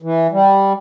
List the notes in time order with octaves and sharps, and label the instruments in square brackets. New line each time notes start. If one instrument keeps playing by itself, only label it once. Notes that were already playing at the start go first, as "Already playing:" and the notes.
[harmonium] E3
G3